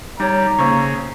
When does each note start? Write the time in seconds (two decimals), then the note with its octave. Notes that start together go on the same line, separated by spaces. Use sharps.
0.20 G3 D#4 C#5 A#5
0.59 C#3 A#3 C5 C#6